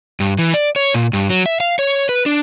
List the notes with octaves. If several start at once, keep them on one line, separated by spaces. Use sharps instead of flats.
G2
E3
D5
C#5
A#2
G2
F#3
E5
F5
C#5
B4
D4